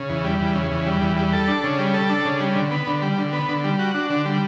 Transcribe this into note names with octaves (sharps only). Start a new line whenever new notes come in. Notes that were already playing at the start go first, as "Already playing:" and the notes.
Already playing: C#3
E2
G3
E2
C#3
E2
G3
E2
G3
A4
D4
C#3
G3
A4
D4
C#3
G3
D3
B3
D3
G3
D3
B3
D3
G3
F#4
D4
D3
G3